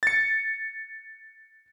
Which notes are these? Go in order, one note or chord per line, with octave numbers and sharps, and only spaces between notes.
A6 C#7